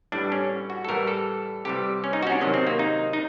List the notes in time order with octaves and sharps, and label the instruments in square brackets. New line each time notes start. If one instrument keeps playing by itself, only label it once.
[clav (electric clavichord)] A2 E3 G3 D4
C#4
F#4
A4
A2 E3 G3 A#4
A4
C3 E3 G3 G4
C#4
D#4
F#4
C#4
D4
C3 D#3 F#3 C#4
C4
A#3
D#4
D#4